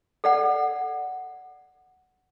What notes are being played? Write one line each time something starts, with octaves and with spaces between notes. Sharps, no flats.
A4 D5 F#5